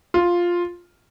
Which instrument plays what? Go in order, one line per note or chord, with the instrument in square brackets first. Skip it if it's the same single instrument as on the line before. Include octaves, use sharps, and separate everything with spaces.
[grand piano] F4